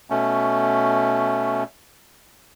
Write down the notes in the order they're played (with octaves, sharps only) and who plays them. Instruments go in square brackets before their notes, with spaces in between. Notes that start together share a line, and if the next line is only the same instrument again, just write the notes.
[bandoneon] B2 A3 C#4